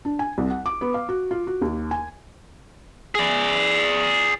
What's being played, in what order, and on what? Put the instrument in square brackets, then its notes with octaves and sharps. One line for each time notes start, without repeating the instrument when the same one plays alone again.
[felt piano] D4
G#5
C2
F#5
D6
B3
F5
F#4
F4
F#4
D#2
G#5
[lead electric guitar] G#4 D5